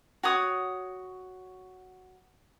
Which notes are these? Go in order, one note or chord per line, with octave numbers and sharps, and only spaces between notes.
F#4 C#5 D#6